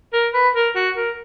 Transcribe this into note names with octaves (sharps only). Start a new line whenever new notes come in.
A#4
B4
A#4
F#4
A#4